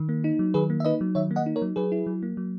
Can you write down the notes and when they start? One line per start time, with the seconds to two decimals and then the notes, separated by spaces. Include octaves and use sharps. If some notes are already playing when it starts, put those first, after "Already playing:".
Already playing: D#3
0.09 A#3
0.24 D#4
0.39 F#3
0.54 D#3 G#4 B4
0.70 A#3
0.80 E5
0.85 D#4 B4 D#5
1.01 F#3
1.15 D#3 C#5 E5
1.31 A#3
1.36 D#5 F#5
1.46 D#4
1.56 A#4 C#5
1.62 F#3
1.76 F#3 G#4 B4
1.92 E4
2.07 F#3
2.23 A#3
2.37 F#3